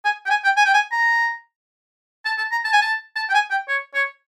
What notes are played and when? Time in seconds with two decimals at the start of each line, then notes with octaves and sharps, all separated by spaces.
0.05 G#5
0.25 G5
0.30 G#5
0.44 G5
0.56 G#5
0.65 G5
0.74 G#5
0.92 A#5
2.25 A5
2.38 A5
2.51 A#5
2.64 A5
2.73 G#5
2.82 A5
3.16 A5
3.29 G5
3.34 G#5
3.50 G5
3.68 C#5
3.94 C#5